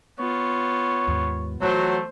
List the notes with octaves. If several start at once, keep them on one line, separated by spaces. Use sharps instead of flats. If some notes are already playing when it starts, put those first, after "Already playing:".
B3 F4 C#5
D#2 G#2
E3 F#3 A3 F4 C5